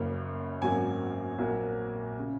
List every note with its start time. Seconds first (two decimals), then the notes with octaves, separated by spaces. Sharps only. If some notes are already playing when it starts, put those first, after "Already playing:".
Already playing: F#1 F#2 C#3 A#3
0.62 G#1 F#2 F#3 A#3 G#5
1.38 A#1 A#2 F#3 A#3
2.19 C#3